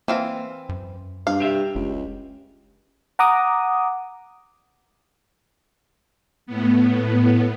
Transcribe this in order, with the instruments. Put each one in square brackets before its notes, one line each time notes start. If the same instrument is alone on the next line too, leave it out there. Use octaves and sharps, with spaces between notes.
[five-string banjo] E3 C4 F5 [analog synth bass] A#3
[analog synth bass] F#2
[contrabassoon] G2 [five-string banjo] F5
[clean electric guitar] G4 E5
[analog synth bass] F#1 [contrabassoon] C#2
[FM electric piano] F#5 A#5 D6 D#6
[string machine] A2 B3